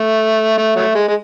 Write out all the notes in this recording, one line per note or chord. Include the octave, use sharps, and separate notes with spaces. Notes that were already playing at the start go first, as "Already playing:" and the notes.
Already playing: A3
A3
F#3 A3
G#3
G#3